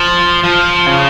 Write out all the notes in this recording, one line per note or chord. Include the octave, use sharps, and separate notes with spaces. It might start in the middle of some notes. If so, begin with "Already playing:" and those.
Already playing: F3
F3
C#3